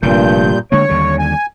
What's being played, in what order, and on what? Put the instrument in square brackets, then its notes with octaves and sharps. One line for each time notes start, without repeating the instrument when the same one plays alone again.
[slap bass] F1 D3 [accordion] G2 A#2 G6
[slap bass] D3 G#3 A#3 [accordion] C#5
[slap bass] D#2 D3 G3
[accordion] G#5